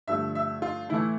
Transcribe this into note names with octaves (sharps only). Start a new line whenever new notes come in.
G2 D3 F3 A3 E5
E5
F4
A2 E3 A3 E4